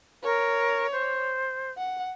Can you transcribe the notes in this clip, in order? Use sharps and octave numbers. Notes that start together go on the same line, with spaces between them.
A#4 C#5
C5
F#5